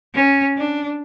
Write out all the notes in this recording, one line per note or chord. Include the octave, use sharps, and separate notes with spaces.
C#4
D4